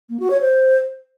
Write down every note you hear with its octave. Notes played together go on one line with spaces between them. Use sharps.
A#3
F#4
C#5
C5